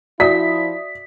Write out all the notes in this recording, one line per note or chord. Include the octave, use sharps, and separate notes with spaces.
F3 E4 F#4 D5 E5 D#6 B6